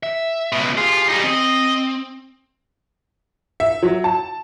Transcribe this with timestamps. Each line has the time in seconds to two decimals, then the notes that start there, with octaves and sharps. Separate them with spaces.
0.03 E5
0.52 C#2 B2
0.77 F4 G4 G#4
1.09 G3 D#4
1.24 C4 D#5
3.60 E5
3.83 F#3
4.04 A5